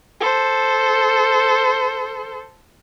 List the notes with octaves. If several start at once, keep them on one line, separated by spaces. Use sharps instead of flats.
A4 C5